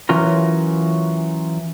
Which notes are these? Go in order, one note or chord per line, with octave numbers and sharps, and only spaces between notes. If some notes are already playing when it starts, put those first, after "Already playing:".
E3 F#3 C#4 F4 A#4